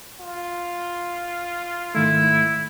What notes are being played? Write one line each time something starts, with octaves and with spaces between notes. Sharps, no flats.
F4
G#2 D#3 A3 E4